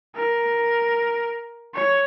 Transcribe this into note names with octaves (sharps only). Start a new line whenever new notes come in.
A#4
C#5